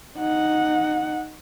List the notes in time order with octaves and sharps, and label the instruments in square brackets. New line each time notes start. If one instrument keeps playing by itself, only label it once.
[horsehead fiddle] D#4 F#5